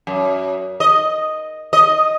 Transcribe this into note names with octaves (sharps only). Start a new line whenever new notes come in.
F#2
D#5
D#5